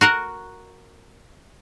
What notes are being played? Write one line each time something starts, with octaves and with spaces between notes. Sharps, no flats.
F#4 A#4 F#5